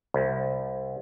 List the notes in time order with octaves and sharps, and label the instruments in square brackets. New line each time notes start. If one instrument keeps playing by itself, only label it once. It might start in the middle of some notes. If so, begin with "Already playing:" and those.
[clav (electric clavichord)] C2